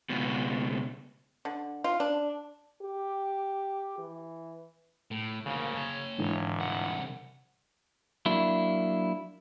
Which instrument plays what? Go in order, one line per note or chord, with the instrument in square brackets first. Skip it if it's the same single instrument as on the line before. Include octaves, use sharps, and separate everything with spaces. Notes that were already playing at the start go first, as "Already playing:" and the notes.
[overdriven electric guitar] C#2 B2
[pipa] D3
F4
D4
[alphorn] G4
E3
[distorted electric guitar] A2
[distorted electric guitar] D2 A#3 [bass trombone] C#3
[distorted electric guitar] C#5 A5
[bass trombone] F1 [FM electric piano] G#2 D3 E3
[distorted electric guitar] C2 F#5
[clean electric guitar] F#3 A#3 D4 E4